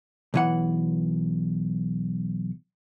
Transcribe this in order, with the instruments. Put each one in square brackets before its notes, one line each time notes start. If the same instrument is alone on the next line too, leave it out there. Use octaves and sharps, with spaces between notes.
[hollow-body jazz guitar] B1 E3 F#5